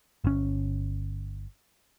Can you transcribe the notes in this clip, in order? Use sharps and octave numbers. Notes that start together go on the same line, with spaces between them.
G1 C#4